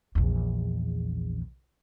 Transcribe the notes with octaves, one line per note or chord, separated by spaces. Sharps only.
A#1 E2